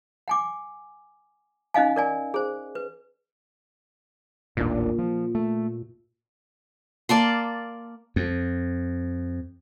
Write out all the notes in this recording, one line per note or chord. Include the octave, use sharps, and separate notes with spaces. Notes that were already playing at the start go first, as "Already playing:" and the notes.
F#5 G#5 D6
C#4 D#4 D#5 F5 G#5
A#4 D5 G#5
G#4 C5
B4
D#1 A1 A#2 D4
F3
A3
A#3 D5 A5 C6
F2